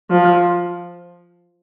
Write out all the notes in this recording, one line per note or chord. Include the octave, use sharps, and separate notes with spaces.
F3